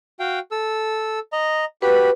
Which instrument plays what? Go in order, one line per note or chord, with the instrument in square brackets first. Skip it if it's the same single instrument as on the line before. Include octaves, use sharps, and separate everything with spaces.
[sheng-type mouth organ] F#4 F5 G5
A4 E6
D#5 A#5
[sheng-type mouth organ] F#4 G4 B5 [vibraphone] B4